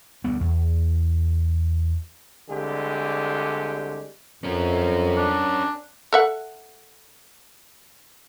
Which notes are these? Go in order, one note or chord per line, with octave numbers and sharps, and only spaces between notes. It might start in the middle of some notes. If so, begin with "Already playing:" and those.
D2 G3 B3
E2
C2 D3 G#3 G4
F2 C#4 A#4
D4
A4 E5 F#5